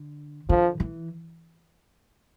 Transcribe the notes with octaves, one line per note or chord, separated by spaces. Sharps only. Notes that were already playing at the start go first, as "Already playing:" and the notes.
Already playing: D3
D3 F3
E3